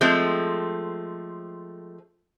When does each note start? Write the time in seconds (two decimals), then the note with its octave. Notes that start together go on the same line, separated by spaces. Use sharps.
0.01 F3 G#3 A3 C4